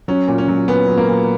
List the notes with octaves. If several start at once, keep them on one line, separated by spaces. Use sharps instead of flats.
F#3 C#4
A#2
C#4
F#3
A#2 B3
F#3
A#3
A#2